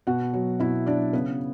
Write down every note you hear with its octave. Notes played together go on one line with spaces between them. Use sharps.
B2 F#4 F#5
F#3
B2 E4 E5
F#3 D4 D5
C#3 B3 B4